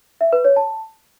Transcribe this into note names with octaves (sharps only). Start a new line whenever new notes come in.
E5
B4
C#5
A5